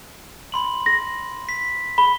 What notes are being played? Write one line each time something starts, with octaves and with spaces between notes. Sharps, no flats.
B5 C6 F#7
A#6
B6
B5 G7